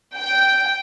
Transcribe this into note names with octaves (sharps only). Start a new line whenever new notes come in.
G5